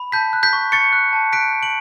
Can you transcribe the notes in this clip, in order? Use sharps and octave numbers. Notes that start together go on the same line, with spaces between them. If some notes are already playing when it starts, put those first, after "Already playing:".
Already playing: B5
A5 G6 B6
F#6
G6 B6
C#6
C#6 A6 C#7
F#6
A5
F#6 B6 D7
F#6
D7 F#7